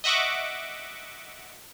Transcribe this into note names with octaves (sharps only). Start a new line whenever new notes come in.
D#5 E5 F#5 C#6 D6